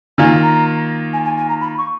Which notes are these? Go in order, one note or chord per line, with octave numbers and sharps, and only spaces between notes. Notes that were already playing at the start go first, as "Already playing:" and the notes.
D#3 A#3 F4 G#5
A#5
G#5
G#5
G#5
A#5
B5
C#6